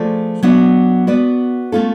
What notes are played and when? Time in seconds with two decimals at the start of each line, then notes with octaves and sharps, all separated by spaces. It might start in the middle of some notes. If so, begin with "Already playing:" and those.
Already playing: F3 A3 F4 G#4 D5
0.43 F#3 B3 D4 F#4
1.07 B3 F#4 B4 D5
1.72 A3 C#4 F4 A4